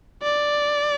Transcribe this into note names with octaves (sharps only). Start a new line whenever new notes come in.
D5